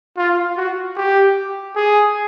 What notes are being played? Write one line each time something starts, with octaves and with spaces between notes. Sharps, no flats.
F4
F#4
G4
G#4